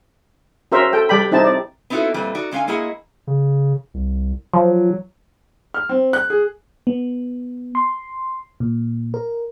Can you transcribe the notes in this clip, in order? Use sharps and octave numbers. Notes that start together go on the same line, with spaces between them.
C#4 F#4 A#4 C5 E5
A4 G5
G3 D5 G5 B5
C4 D#4 E4 A5
D5
B3 C4 D#4 E4 F#4 A4
F2 A#2 G3 A3 B4
D#4 F#4 D5
D3 G#3 C#4 E5 F5 G#5
G#3 A#3 E4 G#4 D#5 F#5
C#3
C2
F3 F#3
F6
C4
F#6
G#4
B3
C6
A#2
A#4